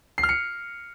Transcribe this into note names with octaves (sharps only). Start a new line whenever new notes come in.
C7
F6
C#7